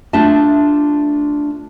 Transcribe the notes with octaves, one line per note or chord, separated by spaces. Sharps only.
A3 D4 F4 A4 E5 A5